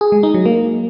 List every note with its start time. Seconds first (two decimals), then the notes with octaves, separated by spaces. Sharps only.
0.01 G#4
0.12 G#3
0.23 D#4
0.34 F#3
0.45 A#3